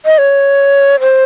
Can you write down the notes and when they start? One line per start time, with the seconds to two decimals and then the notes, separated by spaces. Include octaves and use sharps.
0.06 D#5
0.18 C#5
1.00 C5